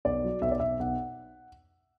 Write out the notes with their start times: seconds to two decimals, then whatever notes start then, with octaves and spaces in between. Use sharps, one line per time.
0.05 B1 D5
0.24 F#3
0.42 B1 E5
0.51 D5
0.60 B1 E5
0.80 B1 F#5